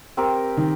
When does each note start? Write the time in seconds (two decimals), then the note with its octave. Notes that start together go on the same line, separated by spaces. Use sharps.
0.17 C4 G4 A#4
0.57 D#3